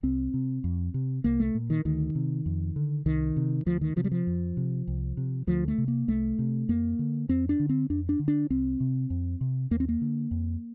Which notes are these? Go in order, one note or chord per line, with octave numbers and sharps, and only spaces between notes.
C2 C4
C3
F2
C3
C2 A#3
A3
A#2
D#3
D2 D#3
C3
F2
D3
C2 D#3
C3
D2 F3
D#3
C3 F3
G3
F3
F2
C3
C2
C3
D2 F3
A3
C3
A#3
C2 A3
C3
F2 A#3
D3
F2 C4
D4
D3
C4
F2 D4
D4
D3
D4
C2 C4
C3
F2
C3
D#2 A#3
C4
A#3
D3
F2